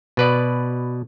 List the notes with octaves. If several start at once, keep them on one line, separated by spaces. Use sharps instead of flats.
B2 B4 D5